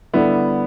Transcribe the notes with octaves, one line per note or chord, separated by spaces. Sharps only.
D3 G3 B3 E4